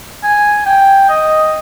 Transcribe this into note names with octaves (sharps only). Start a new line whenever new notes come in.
G#5
G5
D#5